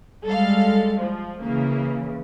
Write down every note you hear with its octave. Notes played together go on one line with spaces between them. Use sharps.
G3 G#3 A4 F5
F3
C#3 E3 A#3